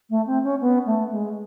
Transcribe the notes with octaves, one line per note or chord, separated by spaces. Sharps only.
A3
C4
C#4
B3
A3
G#3